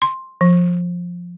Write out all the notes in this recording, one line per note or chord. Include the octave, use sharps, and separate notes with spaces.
C6
F3